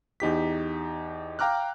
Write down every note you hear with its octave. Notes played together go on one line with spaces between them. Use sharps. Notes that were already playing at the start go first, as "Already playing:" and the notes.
E2 D#4 G4 B6
F5 G5 A#5 D6 F6 F#6